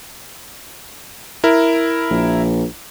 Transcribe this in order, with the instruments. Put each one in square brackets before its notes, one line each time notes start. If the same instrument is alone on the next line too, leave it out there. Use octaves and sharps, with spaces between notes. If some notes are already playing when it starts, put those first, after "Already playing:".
[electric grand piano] E4 A#4
[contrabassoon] A#1